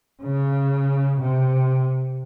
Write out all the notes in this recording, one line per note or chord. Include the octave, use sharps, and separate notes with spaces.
C#3
C3